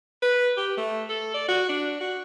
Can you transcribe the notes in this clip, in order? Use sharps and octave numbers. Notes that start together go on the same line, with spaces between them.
B4
G4
A3
A4
D5
F#4
D4
F#4